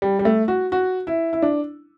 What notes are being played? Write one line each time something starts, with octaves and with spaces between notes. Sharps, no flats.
G3
G3
A3
F#4
F#4
E4
E4
D4